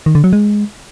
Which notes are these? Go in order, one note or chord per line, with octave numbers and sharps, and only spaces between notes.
D#3
D3
F#3
G#3